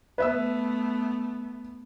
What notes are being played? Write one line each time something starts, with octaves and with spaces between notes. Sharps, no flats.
A3 B3 B4 E5 E6